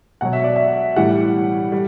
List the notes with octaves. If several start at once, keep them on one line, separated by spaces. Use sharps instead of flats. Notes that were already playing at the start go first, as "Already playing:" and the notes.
B2 F#3 F#5
E5
D5
E5
A2 E3 G3 F#5
G3